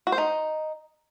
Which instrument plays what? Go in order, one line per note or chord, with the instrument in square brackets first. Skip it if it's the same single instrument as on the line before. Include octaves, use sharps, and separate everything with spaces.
[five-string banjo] F#4
C5
D#4